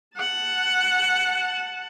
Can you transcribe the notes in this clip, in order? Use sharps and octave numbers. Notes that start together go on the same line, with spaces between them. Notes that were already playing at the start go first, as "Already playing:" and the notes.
F#5 A5